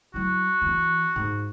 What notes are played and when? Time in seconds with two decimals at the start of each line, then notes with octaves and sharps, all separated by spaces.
0.14 F#3 E4 F#4
0.62 E3 B3
1.16 G#2